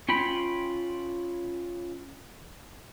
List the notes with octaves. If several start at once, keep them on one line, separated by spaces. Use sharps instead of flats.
C#4 F4 G5 B5